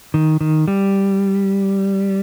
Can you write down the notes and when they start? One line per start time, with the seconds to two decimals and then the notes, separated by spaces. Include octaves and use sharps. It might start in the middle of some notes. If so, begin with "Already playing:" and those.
0.14 D#3
0.41 D#3
0.68 G3